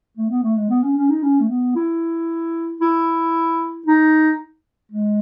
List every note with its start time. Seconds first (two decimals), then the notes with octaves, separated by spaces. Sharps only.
0.17 A3
0.30 B3
0.43 A3
0.57 G#3
0.70 B3
0.83 C#4
0.97 C#4
1.09 D#4
1.23 C#4
1.40 A3
1.49 B3
1.76 E4
2.81 E4
3.86 D#4
4.92 G#3